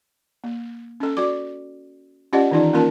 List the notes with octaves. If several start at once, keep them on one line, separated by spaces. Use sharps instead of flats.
A#3
C#4 A4
F#4 D5 D6
C#4 F4 G4 D5 D#5 F#5
D#3 E3 D#4 F4 D5
A#3 C#4 F4 A#4 A5